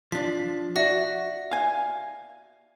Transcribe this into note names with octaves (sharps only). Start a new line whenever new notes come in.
F3 D4 B6
F#4 D5 E5 A#6
F5 G#5